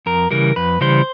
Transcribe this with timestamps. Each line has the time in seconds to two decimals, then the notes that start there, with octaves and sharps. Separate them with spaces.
0.06 F2 A#4
0.31 C#3 E3 G3 A#4
0.56 F2 B4
0.81 C#3 E3 G3 C5